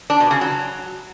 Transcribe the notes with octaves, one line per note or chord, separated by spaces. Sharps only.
D4
B2
C#3
F#3